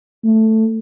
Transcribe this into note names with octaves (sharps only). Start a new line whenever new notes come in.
A3